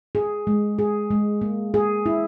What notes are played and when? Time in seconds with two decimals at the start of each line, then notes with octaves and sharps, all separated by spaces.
0.15 G#4
0.47 G#3
0.79 G#4
1.11 G#3
1.41 A#3
1.74 G#4
2.06 E4